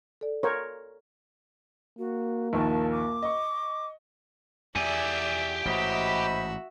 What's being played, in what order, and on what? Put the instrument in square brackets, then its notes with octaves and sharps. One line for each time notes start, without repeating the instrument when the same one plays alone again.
[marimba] A4 D5
[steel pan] A#4 C#5 [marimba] C6 G6
[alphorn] A#3 [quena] F#4
[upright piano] A#1 D#2 D#3 [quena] A5
[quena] D6
[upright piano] D#5 C#6
[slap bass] E2 [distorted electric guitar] G4 G#5 [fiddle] D5 E5
[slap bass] A1 G#2 [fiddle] F#4 E5 [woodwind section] C5 D#5 B5